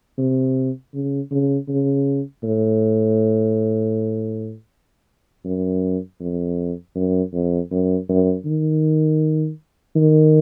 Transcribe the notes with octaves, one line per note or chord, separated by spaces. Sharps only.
C3
C#3
C#3
C#3
A2
F#2
F2
F#2
F2
F#2
F#2
D#3
D#3